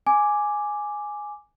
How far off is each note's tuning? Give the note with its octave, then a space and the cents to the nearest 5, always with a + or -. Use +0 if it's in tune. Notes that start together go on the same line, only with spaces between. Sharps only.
G#5 +0 D6 +0